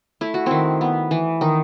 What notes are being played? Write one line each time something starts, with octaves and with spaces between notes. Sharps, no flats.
A3 E4
F#4
D#3 C4 E4
B3
E3
D#3 D#4